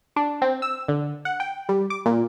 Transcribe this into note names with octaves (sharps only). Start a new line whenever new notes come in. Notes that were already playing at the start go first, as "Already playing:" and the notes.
D4
C4
E6
D3
F#5
G5
G3
D6
A#2